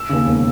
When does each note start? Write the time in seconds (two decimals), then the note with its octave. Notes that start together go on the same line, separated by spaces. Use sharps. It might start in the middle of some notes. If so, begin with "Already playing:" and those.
Already playing: E6
0.09 D#2 C#3
0.26 E1